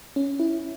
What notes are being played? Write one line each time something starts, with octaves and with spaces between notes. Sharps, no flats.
C#4
E4